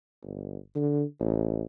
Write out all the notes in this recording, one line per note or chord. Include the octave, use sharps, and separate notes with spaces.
G1
D3
A1